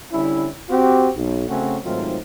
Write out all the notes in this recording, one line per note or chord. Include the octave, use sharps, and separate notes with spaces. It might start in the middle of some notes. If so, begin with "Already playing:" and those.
D3 G3 C#4 E4
C4 F#4 G4
B1
C#3 A3 C4 C#4 F#4
G#2 D#3 F#3 A3 C4 F4